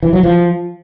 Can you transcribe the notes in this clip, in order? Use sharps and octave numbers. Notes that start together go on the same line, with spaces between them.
E3
F#3
F3